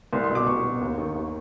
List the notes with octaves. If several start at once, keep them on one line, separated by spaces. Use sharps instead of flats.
C2 C6
C6
B2
D6
C2 C#6
B2
D#2
D#3
D#2